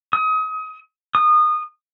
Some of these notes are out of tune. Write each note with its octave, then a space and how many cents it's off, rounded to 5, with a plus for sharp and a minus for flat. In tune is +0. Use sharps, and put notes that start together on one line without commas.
D#6 +30
D#6 -25